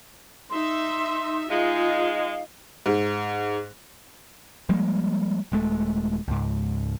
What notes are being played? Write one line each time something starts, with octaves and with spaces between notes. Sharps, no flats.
D#4 E5 C6
G#3 D#4 F4 F5
G#2
F3 G3 G#3 A#3
D#1 G#3 A3
C#2 G#2